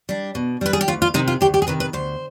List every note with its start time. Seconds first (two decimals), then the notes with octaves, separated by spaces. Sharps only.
0.09 G3 D4
0.35 B2
0.61 G3 D4 B4
0.73 G#4
0.81 G4
0.88 D2 F4
1.02 F4
1.14 C3 D#3 D#4
1.28 F4
1.41 D2 G4
1.54 G4
1.62 G#4
1.67 C3 D#3 B4
1.80 B4
1.93 D2 C5